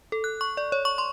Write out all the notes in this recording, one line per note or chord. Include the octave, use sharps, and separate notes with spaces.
A4
F#6
C#6
D5
C#5
C#6
C6